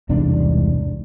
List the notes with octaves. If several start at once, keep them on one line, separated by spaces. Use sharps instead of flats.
E1 C2 G#2 D4